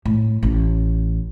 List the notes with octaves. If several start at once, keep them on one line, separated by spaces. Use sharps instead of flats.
A2
A1